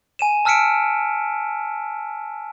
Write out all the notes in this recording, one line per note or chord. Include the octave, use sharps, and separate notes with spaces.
G#5 D#7 E7
A5 E6 F6 B6 C#7 D7